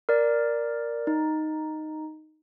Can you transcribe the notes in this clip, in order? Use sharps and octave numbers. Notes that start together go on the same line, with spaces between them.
A#4 D5
D#4